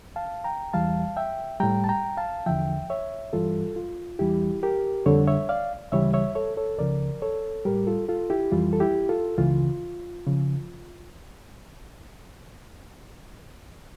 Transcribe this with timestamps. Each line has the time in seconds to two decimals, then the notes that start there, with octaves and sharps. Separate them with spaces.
0.16 F5 A5
0.44 G5 A#5
0.73 E2 E3 G3 F5 A5
1.16 E5 G5
1.60 A2 G3 G5 A#5
1.84 A5
1.89 G5 A#5
2.17 F5 A5
2.46 E2 D3 F3 E5 G5
2.90 C#5 E5
3.33 G2 E3 G3 F4 A4
3.76 F4
4.19 E2 E3 G3 E4 G4
4.63 G4 A#4
5.06 F2 D3 G3 A4 C#5
5.27 C#5 E5
5.49 D5 F5
5.92 D2 C#3 E3 G3 C#5 E5
6.14 C#5 E5
6.35 A4 C#5
6.57 A4 C#5
6.78 C#2 C#3 F3 A#4 D5
7.22 A4 C#5
7.65 A2 G3 G4 A#4
7.87 F4 A4
8.08 F4 A4
8.30 E4 G4
8.52 F2 E3 G3 F4
8.73 A4
8.80 E4 G4
9.09 F4 A4
9.38 C#2 C#3 E3 F4
10.27 C#3 F3